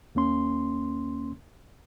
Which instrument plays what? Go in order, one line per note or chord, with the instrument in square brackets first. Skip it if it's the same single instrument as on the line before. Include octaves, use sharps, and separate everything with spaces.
[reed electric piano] D#2 A#3 C#4 C6